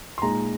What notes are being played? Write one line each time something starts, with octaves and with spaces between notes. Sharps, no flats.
C6
A#2 G#3 D#4 A#5